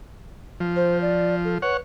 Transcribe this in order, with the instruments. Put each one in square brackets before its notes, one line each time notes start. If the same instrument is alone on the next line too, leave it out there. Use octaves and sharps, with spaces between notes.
[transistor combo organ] F3
[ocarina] C5
D5
A4
[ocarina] B4 [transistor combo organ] C#5 F#5